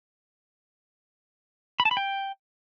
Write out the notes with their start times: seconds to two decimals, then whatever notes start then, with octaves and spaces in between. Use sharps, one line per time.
1.80 B5
1.85 A5
1.91 B5
1.97 G5